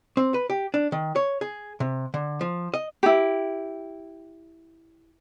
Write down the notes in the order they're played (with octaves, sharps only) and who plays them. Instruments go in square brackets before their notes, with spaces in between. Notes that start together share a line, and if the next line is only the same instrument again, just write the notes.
[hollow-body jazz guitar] C4
B4
G4
D4
D#3
C#5
G#4
C3
D3
F3
D#5
[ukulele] E4 G4